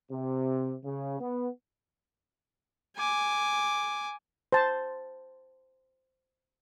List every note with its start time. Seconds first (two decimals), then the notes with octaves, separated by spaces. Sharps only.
0.11 C3
0.84 C#3
1.20 B3
2.97 G#5 D6
4.52 C5 A5